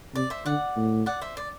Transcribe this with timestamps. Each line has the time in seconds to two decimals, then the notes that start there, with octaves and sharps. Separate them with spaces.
0.14 C3 D5
0.30 C5 E5
0.45 D3 D5 F#5
0.76 A2
1.06 D5 F#5
1.21 C5 E5
1.37 D5